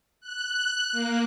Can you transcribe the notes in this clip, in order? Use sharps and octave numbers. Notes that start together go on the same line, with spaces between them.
F#6
A#3